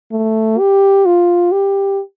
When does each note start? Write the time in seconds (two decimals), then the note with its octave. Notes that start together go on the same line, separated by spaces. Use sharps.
0.12 A3
0.59 G4
1.06 F4
1.52 G4